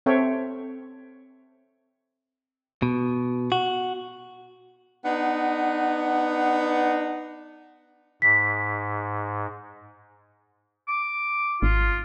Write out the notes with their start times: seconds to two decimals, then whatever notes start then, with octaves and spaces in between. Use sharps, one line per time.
0.06 C4 A4 C#5 E5 G5
2.82 B2
3.52 F#4
5.04 B3 D4 D#4 F#5
8.22 G#2 B6
10.88 D6
11.62 G#1 F4